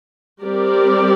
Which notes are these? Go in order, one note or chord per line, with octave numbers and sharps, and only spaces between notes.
G3 C4 G4 A#4 D5